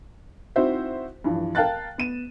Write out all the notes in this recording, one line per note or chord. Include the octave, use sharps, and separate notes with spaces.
C4 D#4 E4 F#4 C5 E5
G2 E3 F3
A#4 F5 G5 A5 F#6 A6
B3 D#7 E7